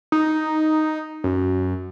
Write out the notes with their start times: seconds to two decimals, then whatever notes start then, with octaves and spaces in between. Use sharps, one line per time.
0.12 D#4
1.24 F#2